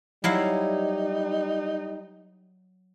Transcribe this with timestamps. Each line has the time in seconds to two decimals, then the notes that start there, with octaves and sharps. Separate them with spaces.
0.24 F#3 G3 D#4 E4 F5